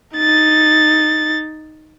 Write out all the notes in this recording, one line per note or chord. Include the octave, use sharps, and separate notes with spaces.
D#4 A6